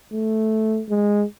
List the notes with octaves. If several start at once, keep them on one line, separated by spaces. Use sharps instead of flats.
A3
G#3